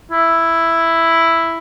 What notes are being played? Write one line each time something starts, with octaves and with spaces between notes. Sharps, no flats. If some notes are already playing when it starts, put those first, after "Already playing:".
E4